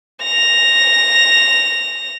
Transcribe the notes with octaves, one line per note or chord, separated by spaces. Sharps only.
A#6 F7